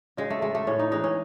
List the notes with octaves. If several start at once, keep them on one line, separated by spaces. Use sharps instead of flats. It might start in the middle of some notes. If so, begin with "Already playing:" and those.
C#3 G#3
A3
G#3 A3
A3
A2 C#4
D#4
E3 G#3 D#4
C#4